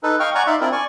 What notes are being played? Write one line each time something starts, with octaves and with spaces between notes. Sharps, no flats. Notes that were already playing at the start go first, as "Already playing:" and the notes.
D#4 A4 B4
D#5 F5 G5 C#6 F6
D5 F#5 G#5 A#5 C#6
D#4 D5 E5 F5 C6
C4 D4 E4 F4 A#4 D5
D5 G#5 C#6